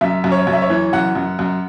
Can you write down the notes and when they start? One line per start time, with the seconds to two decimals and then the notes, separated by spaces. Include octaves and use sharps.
0.01 F#2 E5
0.24 F#2
0.32 C#5
0.47 F#2
0.53 E5
0.62 C#5
0.70 E3
0.93 F#2 F#5
1.15 F#2
1.39 F#2